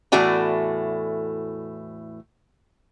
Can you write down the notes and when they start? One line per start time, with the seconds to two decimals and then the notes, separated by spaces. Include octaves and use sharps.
0.12 E2 A2 A3 F#4 D5 G#5